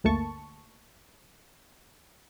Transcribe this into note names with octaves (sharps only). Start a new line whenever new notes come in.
G1 D2 A3 A#3 A5 C#6